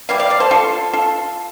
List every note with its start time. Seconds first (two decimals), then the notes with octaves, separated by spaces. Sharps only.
0.09 E3 G3 F5
0.20 D5 F5
0.30 D5 F5
0.40 A4 C5
0.51 F4 A4
0.93 F4 A4